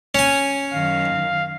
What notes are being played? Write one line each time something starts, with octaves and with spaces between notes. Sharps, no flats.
C#4 G#5
F#2 D#3 F5